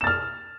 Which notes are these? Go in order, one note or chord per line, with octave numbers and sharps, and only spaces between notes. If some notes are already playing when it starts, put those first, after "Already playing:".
F6 A6 E7